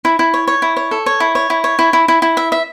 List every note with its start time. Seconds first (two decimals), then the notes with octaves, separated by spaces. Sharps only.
0.05 E4
0.19 E4
0.34 C#5
0.47 C#5
0.62 E4
0.77 C#5
0.91 A4
1.06 C#5
1.20 E4
1.35 C#5
1.50 E4
1.64 C#5
1.79 E4
1.93 E4
2.08 E4
2.22 E4
2.37 E5
2.52 E5